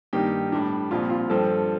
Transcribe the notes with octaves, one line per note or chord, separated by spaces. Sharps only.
G2 D#3 A#3 G4
A2 G3 D4
C2 A#2 F3 F4
F4
G2 F3 C4 A4